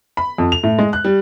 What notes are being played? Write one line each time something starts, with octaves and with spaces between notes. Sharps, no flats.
B5
F2
F7
A2
G#3
F#6
G3